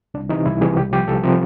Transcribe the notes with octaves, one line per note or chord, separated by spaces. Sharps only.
C2 D4
C3 E3 D#4
C2 E4
C3 E3 G#4
C2 G4
C3 F3 G4
C2 A4
C3 F3 A#4